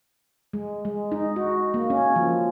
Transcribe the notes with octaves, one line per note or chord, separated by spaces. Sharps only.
G#3
G#3
D#4
F#4
A#3
C#4
F3